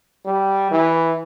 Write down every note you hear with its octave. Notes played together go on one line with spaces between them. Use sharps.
G3
E3